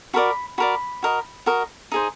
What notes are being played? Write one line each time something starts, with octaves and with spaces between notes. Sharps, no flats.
F#4 A#4 D5 B5
F#4 A#4 D5 B5
F#4 A#4 D#5
F#4 A#4 D#5
D#4 G#4 C5